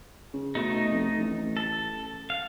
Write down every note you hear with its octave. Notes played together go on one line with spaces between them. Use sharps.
C#3
B2 A3 D#4
F1
A1
A4
F5